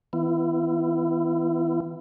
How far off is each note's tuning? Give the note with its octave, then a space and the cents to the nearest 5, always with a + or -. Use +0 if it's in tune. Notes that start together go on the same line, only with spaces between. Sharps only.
E3 -35 B3 +20 E4 +30